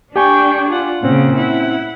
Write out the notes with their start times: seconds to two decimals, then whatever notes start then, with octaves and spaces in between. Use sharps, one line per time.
0.16 D4 G4 G5 G#5 C#6
0.69 F4 F#5
1.03 A#2 C#3 C4 C#4 F#5
1.37 E4 F#5